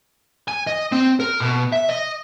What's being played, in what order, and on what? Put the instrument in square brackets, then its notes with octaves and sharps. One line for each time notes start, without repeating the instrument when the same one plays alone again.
[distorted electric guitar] G#5
D#5
C4
A#4
B2
E5
D#5